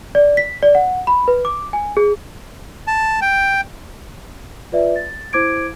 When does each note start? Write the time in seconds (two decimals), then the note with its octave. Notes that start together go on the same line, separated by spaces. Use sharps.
0.15 D5
0.37 B6
0.63 D5
0.75 F#5
1.07 B5
1.28 B4
1.45 D6
1.73 G#5
1.97 G#4
2.87 A5
3.22 G5
4.72 F4 B4 D5 E5
4.96 A6
5.33 E4 C5 D6 G#6 D7